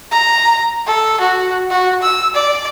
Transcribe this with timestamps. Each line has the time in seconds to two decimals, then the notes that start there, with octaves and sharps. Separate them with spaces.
0.11 A#5
0.86 A4
1.20 F#4
1.71 F#4
2.02 E6
2.35 D5